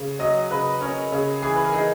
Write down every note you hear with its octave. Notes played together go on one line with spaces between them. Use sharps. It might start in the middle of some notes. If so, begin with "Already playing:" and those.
Already playing: C#3
F#3 D#5
C#3 B4
C#4 A#4
C#3
E3 G#4
B4
A#4
D#4 G#4